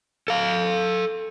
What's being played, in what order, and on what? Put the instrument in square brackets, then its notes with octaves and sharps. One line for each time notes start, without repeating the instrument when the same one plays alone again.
[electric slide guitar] A4 F5